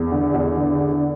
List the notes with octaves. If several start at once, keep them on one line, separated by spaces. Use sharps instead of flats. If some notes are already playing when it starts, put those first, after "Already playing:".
Already playing: E2
D3
E2
D3
D3